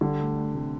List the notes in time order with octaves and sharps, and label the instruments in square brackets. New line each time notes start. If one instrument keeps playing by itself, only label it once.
[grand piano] D3 [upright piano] G3
[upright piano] D2
D2
C3